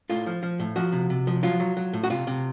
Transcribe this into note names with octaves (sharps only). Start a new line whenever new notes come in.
A2 F4
F3
F3
A2
F3 F#4
C3
C3
F3
F#3 F4
F#3
F#3
A2
F#4
C3 F4
C3